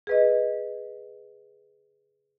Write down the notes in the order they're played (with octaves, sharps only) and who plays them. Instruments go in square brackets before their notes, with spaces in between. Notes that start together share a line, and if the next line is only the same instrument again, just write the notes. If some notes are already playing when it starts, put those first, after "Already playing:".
[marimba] G#4 B4 D#5